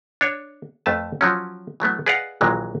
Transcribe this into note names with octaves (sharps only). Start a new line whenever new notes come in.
D4 C#5
F2 A3 B4 A5
F3 F#3 C#4
E3 F#3 A3 B3
G#4 B4 D5 D#5 F5 F#5
A#1 D#2 A#2 E3 F#3 G#3